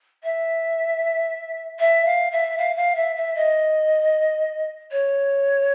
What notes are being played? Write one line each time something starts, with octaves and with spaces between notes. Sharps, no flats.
E5
E5
F5
E5
F5
F5
E5
E5
D#5
C#5